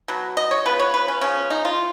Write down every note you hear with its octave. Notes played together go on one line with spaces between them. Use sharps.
B2 F#3
D#5
C#5
C#3 F3 B3 B4
C#5
B4
C#4
C#3 F3 B3 C#4
D#4
F4